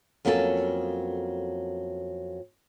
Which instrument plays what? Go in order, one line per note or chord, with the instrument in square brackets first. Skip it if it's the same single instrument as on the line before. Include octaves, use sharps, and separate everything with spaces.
[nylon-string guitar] F2 F#3 A#3 C#4 F#4 A4